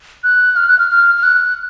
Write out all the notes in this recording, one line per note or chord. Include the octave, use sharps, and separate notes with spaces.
F#6
F6
F#6
F6
F6
F6
F#6